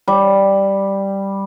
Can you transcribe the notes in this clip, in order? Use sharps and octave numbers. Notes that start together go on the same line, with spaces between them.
G3